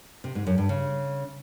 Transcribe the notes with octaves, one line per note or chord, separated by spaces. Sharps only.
C3
G#2
F#2
G2
C#3